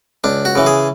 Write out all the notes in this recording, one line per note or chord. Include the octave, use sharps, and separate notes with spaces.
C#2 D4
F#4
C#3 E3
G#4